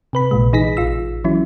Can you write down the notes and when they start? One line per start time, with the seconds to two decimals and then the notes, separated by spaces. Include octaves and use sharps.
0.13 C3 B4 B5
0.31 A#1 A#2 G#3
0.53 E3 D#4 G#4 A#6 B6
0.77 A1 F4 E6
1.24 E3 F#3 C#4 E4